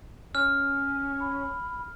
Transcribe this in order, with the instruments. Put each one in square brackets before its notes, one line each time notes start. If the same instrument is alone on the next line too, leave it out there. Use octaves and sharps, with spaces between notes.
[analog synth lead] C#4 [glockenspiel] F6
[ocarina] B5